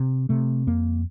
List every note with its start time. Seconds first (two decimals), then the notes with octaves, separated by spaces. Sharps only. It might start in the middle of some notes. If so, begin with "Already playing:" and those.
Already playing: C3
0.29 C3 A3
0.67 F2 A#3